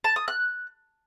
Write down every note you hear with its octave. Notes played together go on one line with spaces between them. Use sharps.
A5
D#6
F#6